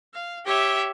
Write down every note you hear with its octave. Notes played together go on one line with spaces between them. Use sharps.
F5
G4 C#5 E5